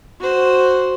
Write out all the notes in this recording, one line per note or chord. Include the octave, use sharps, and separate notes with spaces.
F#4 C5